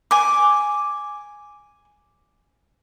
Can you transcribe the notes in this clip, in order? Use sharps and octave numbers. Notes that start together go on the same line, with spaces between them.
G#5 D6